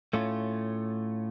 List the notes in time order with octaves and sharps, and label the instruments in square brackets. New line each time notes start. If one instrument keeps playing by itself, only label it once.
[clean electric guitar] A2 A3 C#4 F4